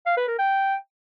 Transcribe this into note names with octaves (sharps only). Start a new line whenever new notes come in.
F5
B4
A#4
G5